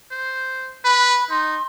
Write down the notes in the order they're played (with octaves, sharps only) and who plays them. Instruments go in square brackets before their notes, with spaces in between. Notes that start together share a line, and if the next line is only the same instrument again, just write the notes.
[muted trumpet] C5
[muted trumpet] B4 [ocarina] B5
[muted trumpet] D#4 [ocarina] C6